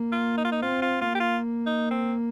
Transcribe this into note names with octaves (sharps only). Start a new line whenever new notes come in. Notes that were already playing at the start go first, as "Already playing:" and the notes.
Already playing: A#3
F4
D#4
F4
D#4
C4 F4
F4
A#3 F4
G4
F4
D#4
C4